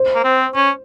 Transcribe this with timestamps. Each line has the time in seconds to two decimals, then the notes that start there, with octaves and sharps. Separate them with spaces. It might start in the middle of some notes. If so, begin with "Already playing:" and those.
Already playing: C5
0.15 A#3
0.24 C4
0.55 C#4